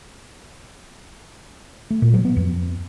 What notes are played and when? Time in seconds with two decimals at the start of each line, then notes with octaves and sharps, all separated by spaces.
1.90 A3
2.02 A#2
2.13 F#3
2.25 B3
2.36 F2